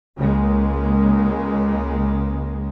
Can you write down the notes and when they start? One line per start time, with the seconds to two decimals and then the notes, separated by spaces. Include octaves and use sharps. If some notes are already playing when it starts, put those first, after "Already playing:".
0.17 C#2 C#3 G#3 A#3